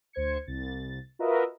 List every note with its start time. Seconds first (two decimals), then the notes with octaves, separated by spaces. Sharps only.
0.13 D2 C5 G#6 C#7
0.47 C2 A6
1.19 F4 F#4 A#4 B4 D#5 E5